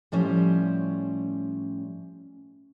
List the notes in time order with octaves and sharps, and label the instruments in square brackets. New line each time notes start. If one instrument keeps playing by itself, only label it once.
[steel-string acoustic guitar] A2 F3 G3 C#4 C5